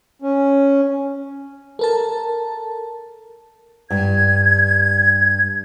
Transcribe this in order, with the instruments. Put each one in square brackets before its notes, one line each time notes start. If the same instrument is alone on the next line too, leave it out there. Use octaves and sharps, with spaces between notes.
[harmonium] C#4
[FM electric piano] A4 A#4 A5
[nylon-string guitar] G2 [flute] G#6